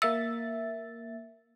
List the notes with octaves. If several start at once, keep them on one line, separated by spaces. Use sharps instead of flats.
A#3 E5 E6 A6